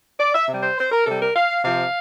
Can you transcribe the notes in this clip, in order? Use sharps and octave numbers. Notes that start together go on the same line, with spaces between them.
D5
E5
C3 G3
C5
C5
A#4
C3 G3 A4
A#4
F5
C3 F3 F5